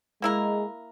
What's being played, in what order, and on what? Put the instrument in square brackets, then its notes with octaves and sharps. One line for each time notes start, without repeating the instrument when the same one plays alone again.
[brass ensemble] G#3 [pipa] A#3 E4 A#4